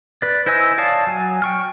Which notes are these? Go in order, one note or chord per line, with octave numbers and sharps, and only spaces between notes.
B4 D5
E4 C5 D#5 G#5 E6
C#5 D5 F5 A5 D#6
F#3 G#5
G5 C#6 F6